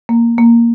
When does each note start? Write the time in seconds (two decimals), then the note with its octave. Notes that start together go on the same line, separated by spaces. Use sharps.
0.09 A#3
0.38 A#3